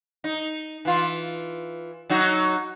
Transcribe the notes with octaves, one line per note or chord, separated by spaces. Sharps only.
D#4
E3 F4
F#3 D#4 F#4